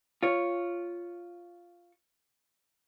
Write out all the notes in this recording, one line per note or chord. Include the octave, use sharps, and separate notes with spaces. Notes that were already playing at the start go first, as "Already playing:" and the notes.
F4 C#5